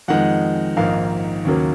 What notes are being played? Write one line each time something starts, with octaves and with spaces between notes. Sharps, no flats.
F2 D#3 G#3 F#5
A#1 G#2 D#3 A#3 F5
D#2 C#3 F#3 A#3